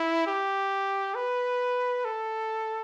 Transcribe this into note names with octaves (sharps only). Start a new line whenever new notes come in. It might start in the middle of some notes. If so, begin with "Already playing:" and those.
Already playing: E4
G4
B4
A4